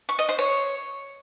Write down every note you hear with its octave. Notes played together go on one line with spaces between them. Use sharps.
C#6
D#5
C5
C#5